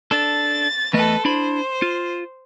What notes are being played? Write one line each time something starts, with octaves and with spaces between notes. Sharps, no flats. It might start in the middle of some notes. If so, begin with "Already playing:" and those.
D4 A4 A6
E2 A3 A4 B4 D#5
D4 E4 C5 B5
F4